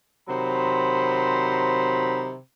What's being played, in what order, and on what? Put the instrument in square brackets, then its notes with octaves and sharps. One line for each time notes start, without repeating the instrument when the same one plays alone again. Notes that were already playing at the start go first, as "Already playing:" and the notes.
[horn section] C3 D#3 F#3 C5 A#5 B5